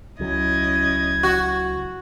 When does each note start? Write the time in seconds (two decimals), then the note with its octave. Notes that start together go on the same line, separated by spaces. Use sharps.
0.20 C#2 F#3 C#4 E4 D#5 G#6
1.23 F#4